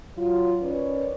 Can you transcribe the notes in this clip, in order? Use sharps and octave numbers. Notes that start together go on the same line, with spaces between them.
F#3 F4
D#3 C#4 B4 C#5 D5